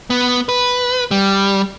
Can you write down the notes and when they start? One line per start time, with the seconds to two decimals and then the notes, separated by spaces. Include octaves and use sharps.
0.10 B3
0.49 B4
1.11 G3